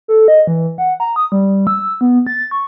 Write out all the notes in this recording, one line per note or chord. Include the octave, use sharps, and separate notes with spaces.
A4
D#5
E3
F#5
A#5
D#6
G3
E6
B3
A6
C#6